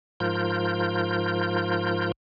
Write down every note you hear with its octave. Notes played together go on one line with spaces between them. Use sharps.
G#2 F3 F4 A#4 G6